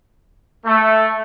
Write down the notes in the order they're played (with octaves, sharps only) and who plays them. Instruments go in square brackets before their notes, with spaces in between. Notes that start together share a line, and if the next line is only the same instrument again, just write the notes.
[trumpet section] A3